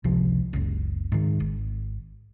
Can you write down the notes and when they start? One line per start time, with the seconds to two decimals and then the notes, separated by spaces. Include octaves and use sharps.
0.04 G#1 C#2 C3 F3
0.53 F#1 C#2
1.12 G#2 D#3
1.40 G#1